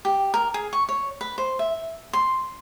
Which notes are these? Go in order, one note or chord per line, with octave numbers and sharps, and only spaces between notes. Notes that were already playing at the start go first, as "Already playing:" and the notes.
G4
A#4
G#4
C#6
C#5
B4
C5
E5
C6